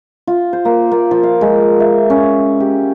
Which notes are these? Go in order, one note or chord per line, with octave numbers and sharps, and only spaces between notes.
F4
C5
A#3
A#3
F3
F5
G#3
E5
C#4
G4